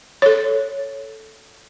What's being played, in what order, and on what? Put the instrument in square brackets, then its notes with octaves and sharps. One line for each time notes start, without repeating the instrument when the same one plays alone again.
[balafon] A4 C#5